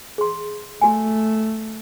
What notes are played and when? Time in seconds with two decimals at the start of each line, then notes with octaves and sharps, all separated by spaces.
0.18 G#4 C6
0.81 A3 F#4 G#5